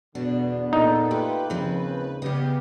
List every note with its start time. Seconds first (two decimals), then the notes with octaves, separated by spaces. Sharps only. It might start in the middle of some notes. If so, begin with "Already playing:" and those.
0.15 E2 B2 D3 B3 D4
0.73 A#2 D#4 A4
1.11 A#2 A3 F4 G4 B4
1.50 D#2 C#3 F3 C4
2.22 C#3 B3 G4 D#5 F5